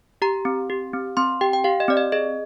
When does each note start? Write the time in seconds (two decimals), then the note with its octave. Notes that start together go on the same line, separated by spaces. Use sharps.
0.22 G4 A#5
0.45 C4
0.70 G4
0.93 C4
1.17 C4 C6
1.41 G4 G5
1.53 G5
1.64 G4 F5
1.80 D#5
1.88 C4 D5
1.97 D#5
2.12 G#4 D#5